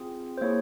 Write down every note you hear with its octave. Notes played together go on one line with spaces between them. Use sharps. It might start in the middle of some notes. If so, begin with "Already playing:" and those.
Already playing: C4 F4 G#4
C5
A#3 E4 G#4 C#5